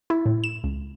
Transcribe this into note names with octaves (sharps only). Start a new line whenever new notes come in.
E4
A2
E7
C#2